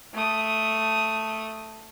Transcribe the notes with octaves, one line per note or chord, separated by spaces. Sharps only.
A3 D#6